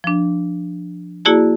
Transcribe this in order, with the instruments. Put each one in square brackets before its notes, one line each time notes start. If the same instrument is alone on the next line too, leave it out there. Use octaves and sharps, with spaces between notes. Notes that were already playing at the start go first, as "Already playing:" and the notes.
[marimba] F3 D4
A#3 E4 F#4 G#4 D5 A5